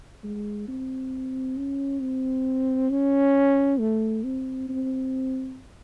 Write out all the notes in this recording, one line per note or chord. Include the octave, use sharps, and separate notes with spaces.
G#3
C4
C#4
C4
C#4
A3
C4
C4